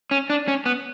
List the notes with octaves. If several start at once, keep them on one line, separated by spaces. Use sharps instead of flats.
C#4
D4
C#4
B3